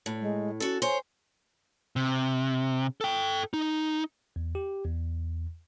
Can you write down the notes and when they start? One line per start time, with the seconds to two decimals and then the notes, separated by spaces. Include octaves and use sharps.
0.06 A2
0.21 G#3
0.60 C#4 F#4 A4
0.82 C5 C#5 G#5
1.96 C3
3.01 A4 G5
3.54 D#4
4.36 E2
4.55 G4
4.85 E2